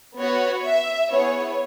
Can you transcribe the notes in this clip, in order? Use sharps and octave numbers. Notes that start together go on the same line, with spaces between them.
B3 F#4 C#5
E5
B3 E4 G#4 C#5